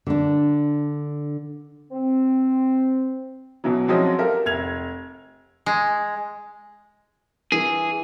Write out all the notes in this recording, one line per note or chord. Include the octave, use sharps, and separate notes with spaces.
D3 D4
C4
B2 E3 F#3
F3 F#3 G#3 C4 C#4 D#5
F4 G4 A4 A#4 E5
F1 G#6 F7
G#3
E3 G#4